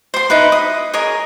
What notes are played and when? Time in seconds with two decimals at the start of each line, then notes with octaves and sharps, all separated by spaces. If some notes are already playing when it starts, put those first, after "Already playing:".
0.14 C5 C6
0.30 D#4 E4 B4
0.52 D#6
0.94 G#4 A#4 C#5 D#5